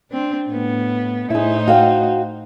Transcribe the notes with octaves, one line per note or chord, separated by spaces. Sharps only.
C4 D4
A2 B3
A2 D#4 E4 G#4 C5
F#4 F5 G5